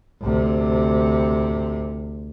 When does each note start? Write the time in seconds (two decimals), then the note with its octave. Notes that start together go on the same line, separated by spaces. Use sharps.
0.21 D2 C3